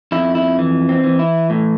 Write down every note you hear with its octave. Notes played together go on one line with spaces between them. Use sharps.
F2 E4
E4
E3
C4
E3
E4
A2